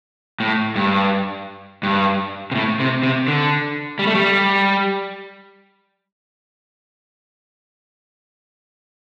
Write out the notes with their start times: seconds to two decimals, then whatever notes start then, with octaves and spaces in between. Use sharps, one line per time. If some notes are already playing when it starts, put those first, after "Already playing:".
0.40 A2
0.76 G2
1.83 G2
2.51 C3
2.55 A2
2.80 C3
3.03 C3
3.28 D3
3.99 G3
4.07 A3
4.15 G3